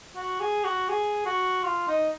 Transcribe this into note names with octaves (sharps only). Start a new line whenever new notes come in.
F#4
G#4
F#4
G#4
F#4
F4
D#4